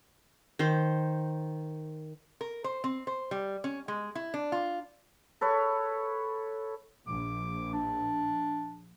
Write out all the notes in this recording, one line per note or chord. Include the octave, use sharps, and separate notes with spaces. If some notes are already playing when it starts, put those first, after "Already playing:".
D#3 C5
A#4
C5
C4
C5
G3
C#4
G#3
E4
D4
F4
A4 B4 C#5
A#1 D6
D4